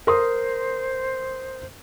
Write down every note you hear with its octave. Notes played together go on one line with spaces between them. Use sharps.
A#4 C5 C6 D#6